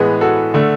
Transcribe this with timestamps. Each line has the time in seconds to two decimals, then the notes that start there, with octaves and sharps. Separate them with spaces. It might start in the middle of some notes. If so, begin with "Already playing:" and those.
Already playing: A2 E3 G#3 B3 G#4 B4
0.21 F#4 A4
0.54 D3 A3